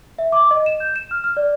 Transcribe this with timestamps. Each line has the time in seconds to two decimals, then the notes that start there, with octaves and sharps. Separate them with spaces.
0.19 E5
0.32 D6
0.51 D#5
0.66 E7
0.80 G6
0.96 E7
1.11 F6
1.24 F6
1.37 D5